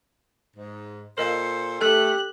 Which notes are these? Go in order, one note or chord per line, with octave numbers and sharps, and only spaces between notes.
G#2
A#2 A4 A#4 C5 D#5 F5
A3 G4 A4 F#6